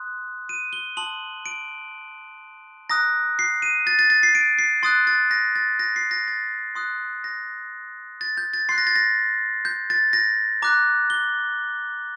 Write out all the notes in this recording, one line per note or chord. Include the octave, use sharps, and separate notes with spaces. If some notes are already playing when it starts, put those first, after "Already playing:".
Already playing: C6 D#6 F#6
D#7
G7
A5 C6 D#6 F#7
D7
A#5 D#6 F#6 A#6
C7
D#7
A6
A6
A6
C7
D7
C7
C6 D#6 F#6 A6
A6
A#6
A6
A#6
C7
A#6
A6
C6 D#6 F#6
A#6
A6
G6
A6
C6 F#6 C7
A#6
A6
A#6
G6
A6
A#6
A#5 D6 F#6
G7